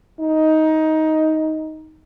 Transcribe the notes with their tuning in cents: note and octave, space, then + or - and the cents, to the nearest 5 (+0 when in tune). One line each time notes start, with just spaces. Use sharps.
D#4 +15